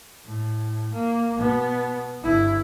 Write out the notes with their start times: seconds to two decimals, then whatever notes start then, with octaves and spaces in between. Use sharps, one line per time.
0.25 A2
0.92 A#3
1.37 B2 B3
2.23 G1 E4